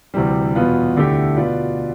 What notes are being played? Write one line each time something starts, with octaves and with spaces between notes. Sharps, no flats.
D2 C3 E3 G3
E2 B2 B3 F4
D2 D3 A3 E4 G4
B2 B3 F4 B4 D5